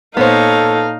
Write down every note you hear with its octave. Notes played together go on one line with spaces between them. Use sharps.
A#2 B3 D#4 A4 C5 C#5 F5